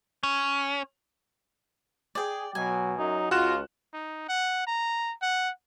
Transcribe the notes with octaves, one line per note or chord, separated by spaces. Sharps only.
C#4
G#4 D5 G5
B2 F#3 G#5
F#2 F#3 D#4
C#2 F4 F#4 F#6 E7
D#4
F#5
A#5
F#5